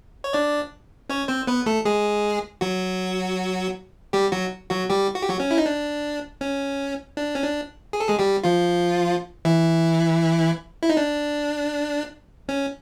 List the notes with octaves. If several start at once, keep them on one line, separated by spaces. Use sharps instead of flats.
C#5
D4 D5
C#4 C#5
C4 C5
B3 B4
A3 A4
G#3 G#4
F#3 F#4
G3 G4
F#3 F#4
F#3 F#4
G3 G4
F#4
G4
F#3 F#4
C#4
E4
D#4
D4
C#4
D4
C#4
D4
G#4
A4
G#3 G#4
G3 G4
F3 F4
E3 E4
E4
D#4
D4
C#4